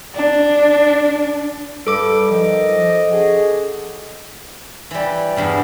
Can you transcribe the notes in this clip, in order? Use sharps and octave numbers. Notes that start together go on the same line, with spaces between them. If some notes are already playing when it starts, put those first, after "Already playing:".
D4
G2 G3 A4 B4 D6 D7
D#3 F3 D#5
F3
C#4 F#4 G#4
E3 G3
E2 G2 B2